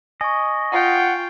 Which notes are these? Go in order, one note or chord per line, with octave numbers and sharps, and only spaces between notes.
D#5 G#5 C#6
F4 F#5 G5